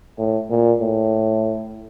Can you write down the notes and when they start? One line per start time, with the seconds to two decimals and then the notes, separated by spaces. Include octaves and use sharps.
0.18 A2
0.50 A#2
0.81 A2